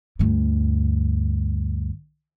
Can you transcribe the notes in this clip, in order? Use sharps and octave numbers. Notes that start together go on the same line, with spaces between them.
D2 G2